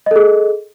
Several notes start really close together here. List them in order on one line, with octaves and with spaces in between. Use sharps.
D#5 A4 G#4